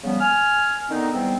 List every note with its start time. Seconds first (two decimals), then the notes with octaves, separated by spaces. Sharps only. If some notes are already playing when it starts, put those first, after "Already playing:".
0.03 C#3 F3 G3 B3
0.20 G#5 F6
0.90 D3 D#3 B3 C4 D#4
1.13 G#2 E3 G3 B3 C4